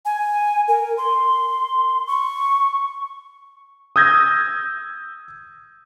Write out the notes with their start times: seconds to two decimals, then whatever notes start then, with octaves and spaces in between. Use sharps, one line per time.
0.05 G#5
0.68 A#4
0.98 C6
2.07 C#6
3.96 D#6 E6 G6 G#6 A#6